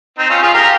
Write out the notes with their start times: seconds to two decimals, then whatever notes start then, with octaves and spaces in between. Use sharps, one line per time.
0.18 C4 D#4
0.30 C#4 F4
0.42 F4 G#4
0.54 G4 A#4